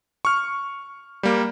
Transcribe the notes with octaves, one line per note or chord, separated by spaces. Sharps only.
C#6 F6
G3 A#3